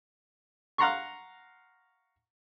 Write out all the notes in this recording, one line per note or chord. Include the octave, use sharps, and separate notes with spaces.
F5 F#5 A#5 C6 C#6